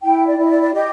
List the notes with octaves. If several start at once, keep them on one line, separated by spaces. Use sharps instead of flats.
E4 G5
D5
E4
D#5
D5
D5
G4 D#5